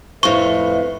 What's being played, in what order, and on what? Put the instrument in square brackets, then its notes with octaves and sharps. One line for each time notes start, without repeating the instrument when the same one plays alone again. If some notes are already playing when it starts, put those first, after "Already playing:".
[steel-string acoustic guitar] F2 A2 [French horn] B4 [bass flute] E5 [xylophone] C#6